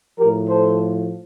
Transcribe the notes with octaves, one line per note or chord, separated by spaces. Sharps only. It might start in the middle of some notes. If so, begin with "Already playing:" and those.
A2 F3 G4 A#4
A4 C5